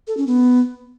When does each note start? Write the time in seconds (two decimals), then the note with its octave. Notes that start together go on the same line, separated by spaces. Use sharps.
0.07 A4
0.17 C#4
0.27 B3